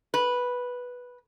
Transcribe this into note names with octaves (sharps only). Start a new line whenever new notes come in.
B4